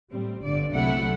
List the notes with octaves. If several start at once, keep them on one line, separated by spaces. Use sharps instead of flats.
A2 G3 C4
G1 G2 D3 D5
C2 C3 F#3 A3 E4 F#5